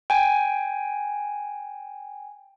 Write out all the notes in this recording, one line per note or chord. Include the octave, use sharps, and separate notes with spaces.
G5 G#5